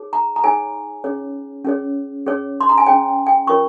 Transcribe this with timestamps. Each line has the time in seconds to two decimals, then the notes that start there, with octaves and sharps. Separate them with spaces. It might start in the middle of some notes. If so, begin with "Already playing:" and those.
Already playing: D#4 G#4 C#5
0.13 A#5
0.36 A#5
0.44 D#4 G#4 C#5 G#5
1.04 C#4 G#4 C#5
1.65 C#4 G#4 C#5
2.26 C#4 G#4 C#5
2.61 C6
2.69 A#5
2.78 G#5
2.87 C#4 G#4 C#5 G5
3.27 G5
3.47 C#4 F4 A#4 C#5 C#6